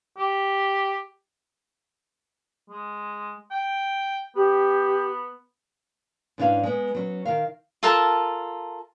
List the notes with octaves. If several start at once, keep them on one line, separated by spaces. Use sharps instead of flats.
G4
G#3
G5
B3 G4
G#2 E3 C#4 D4 C5 F5
G#3 B3
F#3 C#4
D#3 A#4 F5
F4 A4 A#4 A5